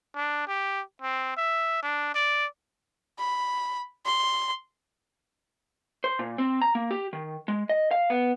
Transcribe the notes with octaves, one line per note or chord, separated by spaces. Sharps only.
D4
G4
C4
E5
D4
D5
B5
C6
C5
A#2
C4
A#5
A#3
G4
D#3
G#3
D#5
F5
B3